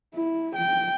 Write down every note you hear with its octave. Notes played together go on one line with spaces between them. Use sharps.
E4
G5